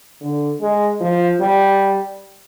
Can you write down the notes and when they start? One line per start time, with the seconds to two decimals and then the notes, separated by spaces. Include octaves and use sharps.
0.21 D3
0.61 G#3
1.00 F3
1.40 G3